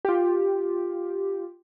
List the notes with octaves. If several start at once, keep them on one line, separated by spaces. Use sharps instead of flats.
F4 G4